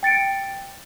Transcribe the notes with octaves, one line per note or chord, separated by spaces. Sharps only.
G5 A6 C#7 D7